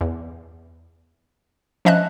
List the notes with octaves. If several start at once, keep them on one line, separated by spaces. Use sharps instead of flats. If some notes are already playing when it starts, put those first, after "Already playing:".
E2
F3 C#4 D#5 E5 A5 F#6